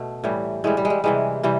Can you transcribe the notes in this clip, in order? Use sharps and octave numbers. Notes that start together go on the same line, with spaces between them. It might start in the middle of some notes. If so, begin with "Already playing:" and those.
Already playing: B2 A3
A2 E3 G3
A2 E3 G3 G#3
G3
G#3
G3
C3 E3 G3 G#3
C3 E3 G3